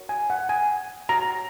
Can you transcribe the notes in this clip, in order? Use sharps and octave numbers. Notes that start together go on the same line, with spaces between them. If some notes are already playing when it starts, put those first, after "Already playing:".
Already playing: F#4 A#4 C#5
G#5
F#5
G#5
F#4 C#5 A#5